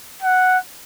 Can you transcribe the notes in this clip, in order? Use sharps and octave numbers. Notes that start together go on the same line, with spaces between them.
F#5